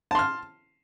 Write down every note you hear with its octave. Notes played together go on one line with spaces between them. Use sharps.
A5 C6 F6